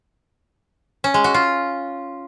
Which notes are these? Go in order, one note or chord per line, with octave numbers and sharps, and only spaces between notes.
C#4
G#3
F#4
F4